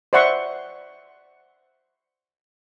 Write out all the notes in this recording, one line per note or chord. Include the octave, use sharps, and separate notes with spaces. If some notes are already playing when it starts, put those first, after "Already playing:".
C5 D5 E5 F#5 C6 C#6